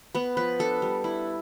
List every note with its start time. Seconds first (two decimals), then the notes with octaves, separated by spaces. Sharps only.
0.15 B3 B4
0.37 F3 B4
0.59 D4 A4
0.82 G3
1.04 E4